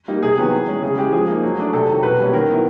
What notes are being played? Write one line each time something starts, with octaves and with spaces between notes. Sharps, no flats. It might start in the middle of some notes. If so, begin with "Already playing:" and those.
G3 A#3 D#4
C3 G#4
D#3 F#3 B3
E3
G#3 C#4
C#3 G#4
E3 G#3 G4
F3 G#4
A#3 D#4
F#3
A3 D4
C3 A4
D#3 F#3
B2 B4
G3 A#3 C#4
D#3 A#4
F#3 B3 E4